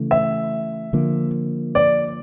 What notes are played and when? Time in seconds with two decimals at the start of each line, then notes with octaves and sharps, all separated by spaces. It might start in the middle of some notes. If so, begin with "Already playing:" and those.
Already playing: C#3 E3 A3
0.11 E5
0.93 D3 F3 A#3
1.75 D5